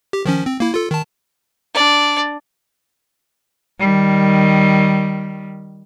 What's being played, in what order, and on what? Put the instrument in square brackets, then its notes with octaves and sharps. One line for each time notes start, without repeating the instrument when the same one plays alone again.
[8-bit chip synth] G4
D#3 F3 C#4
C4
A#3 E4
F4 A4
D#3 A5
[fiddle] D4 D5
[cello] D#3 G3